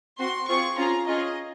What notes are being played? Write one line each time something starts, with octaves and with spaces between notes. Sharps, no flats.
C4 F#4 C6
C4 F4 G#4 C#6
C#4 F4 G#4 A#5
C#4 F4 G#4 D#5